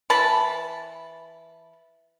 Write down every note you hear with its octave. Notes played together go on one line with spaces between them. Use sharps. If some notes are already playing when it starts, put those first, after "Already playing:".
E3 A5 B5